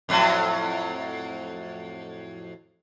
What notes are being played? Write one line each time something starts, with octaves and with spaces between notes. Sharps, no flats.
F2 A2 F#3